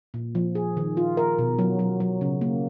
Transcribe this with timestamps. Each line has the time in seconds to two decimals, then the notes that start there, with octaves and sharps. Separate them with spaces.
0.14 A#2
0.35 F3
0.55 G#4
0.77 D#3
0.97 F4
1.17 A#4
1.39 B2
1.59 F#3
1.79 F#3
2.00 F#3
2.21 C#3
2.41 A#3